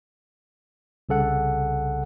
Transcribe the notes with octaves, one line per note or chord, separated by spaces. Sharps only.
C2 C#3 A4 F#5